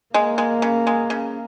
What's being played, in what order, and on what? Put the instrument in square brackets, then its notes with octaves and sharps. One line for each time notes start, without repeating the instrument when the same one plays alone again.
[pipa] G#3 [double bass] A#3
[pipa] G#3
C#3
G#3
C#3